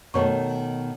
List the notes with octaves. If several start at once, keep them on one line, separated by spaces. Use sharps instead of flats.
B2 D#3 A3 C#5 C#6